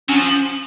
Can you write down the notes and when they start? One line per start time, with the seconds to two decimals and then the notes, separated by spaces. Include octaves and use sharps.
0.09 F#3 C#4
0.16 F3